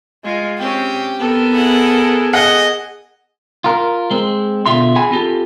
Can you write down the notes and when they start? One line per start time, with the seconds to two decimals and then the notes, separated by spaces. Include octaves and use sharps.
0.24 G#3 F4
0.58 C4 C#4 G4
1.19 B3 A4 A#4
1.53 E4 G#4 F#5
2.33 G#4 D#5 F#5
3.64 F4 A#4
4.11 G#3 C4
4.66 B2 D3 F4 E5 C6
4.95 G#4 F#5 G#5 B5
5.11 C4 F4 G4 A4